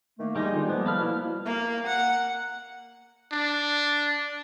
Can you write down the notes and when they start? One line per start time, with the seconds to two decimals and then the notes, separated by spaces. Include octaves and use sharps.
0.19 D#3 A3 A#3
0.36 G3 G#3 D#4
0.54 D3 D#3 F4
0.69 F3 A#3 B3
0.86 A4 B4 F6
0.99 B2 G3 E4
1.46 A#3
1.87 F#5
3.32 D4